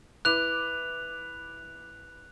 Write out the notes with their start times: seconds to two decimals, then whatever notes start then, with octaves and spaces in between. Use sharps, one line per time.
0.25 E4 B4 D6 F#6 F7